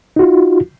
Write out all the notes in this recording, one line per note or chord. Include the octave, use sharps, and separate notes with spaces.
D#4 F4 F#4